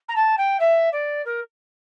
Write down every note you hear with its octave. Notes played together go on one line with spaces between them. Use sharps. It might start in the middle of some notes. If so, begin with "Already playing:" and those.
A#5
A5
G5
E5
D5
A#4